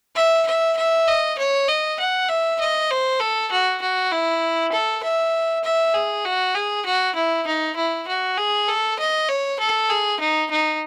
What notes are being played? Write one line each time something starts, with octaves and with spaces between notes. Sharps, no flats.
E5
E5
E5
D#5
C#5
D#5
F#5
E5
D#5
C5
A4
F#4
F#4
E4
A4
E5
E5
G#4
F#4
G#4
F#4
E4
D#4
E4
F#4
G#4
A4
D#5
C#5
A4
G#4
D#4
D#4